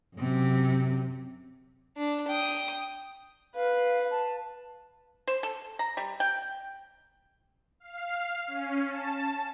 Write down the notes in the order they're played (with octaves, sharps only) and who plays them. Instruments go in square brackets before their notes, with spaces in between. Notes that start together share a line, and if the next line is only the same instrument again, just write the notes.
[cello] F#2 C3
[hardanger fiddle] D4
G5 D#6
[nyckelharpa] B4 [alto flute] F5
[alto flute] A5
[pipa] C5
A4
A#5
G3
G5
[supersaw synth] F5
C#4
A5